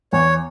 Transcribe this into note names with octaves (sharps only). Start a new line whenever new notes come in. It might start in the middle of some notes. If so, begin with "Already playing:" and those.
E2 C#5